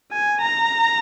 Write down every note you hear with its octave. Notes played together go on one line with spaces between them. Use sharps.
G#5
A#5